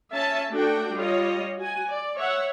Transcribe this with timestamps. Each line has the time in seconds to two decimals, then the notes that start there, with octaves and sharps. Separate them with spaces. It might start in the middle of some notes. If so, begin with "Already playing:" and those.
0.13 C#4 E5 A5
0.52 A3 D4 F#4 A4 G5
0.94 G3 F4 C#5 D#5
1.58 F#4 G#5
1.88 D5
2.18 C#5 E5 F#5